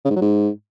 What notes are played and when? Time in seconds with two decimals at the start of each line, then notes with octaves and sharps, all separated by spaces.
0.05 C#3
0.11 G#2
0.16 F#3
0.21 G#2